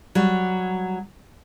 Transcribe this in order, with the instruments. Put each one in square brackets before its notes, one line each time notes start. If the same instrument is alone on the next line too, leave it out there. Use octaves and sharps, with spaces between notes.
[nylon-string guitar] F#3 G3